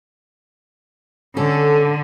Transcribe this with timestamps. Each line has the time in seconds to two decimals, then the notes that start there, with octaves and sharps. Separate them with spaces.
1.37 D3 C#4 A4